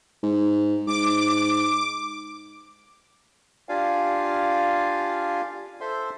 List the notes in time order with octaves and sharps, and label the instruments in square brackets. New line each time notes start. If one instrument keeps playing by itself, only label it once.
[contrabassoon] G#2
[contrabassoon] G#2 [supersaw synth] D6
[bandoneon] D4 F4 G4 D5 F5 G#5
A4 C5 E5 C6